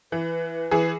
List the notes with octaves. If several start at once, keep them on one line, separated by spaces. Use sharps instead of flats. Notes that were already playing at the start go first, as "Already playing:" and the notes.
E3 B4
E3 G#4